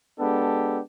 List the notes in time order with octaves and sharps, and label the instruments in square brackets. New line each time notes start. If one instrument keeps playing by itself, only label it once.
[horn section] G#3 B3 D4 G4 A4